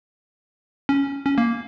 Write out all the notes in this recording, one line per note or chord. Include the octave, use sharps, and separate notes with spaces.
C#4
C#4
A#3